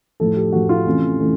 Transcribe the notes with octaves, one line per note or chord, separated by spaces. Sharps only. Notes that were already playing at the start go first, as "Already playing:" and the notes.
A2 F3 A3 A4
G4
A2 F3 A3 F#4
F4
C3 E3 A3 C#4
E3 A3 C#4